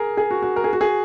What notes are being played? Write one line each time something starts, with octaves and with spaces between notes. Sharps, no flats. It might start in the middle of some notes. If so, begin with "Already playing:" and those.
Already playing: G#4 A#4
G#4
F#4
F#4
A#4
G#4
F#4
G#4